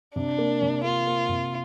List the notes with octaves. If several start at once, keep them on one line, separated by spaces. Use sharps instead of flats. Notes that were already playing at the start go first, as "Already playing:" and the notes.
C3 D4
A#3
C3
A#3 F4
A#3
C3